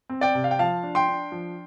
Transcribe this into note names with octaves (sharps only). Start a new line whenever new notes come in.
C4
D5 G5
C3
F5
G5
F3 F5 A5
D4
G5 C6
D4
F3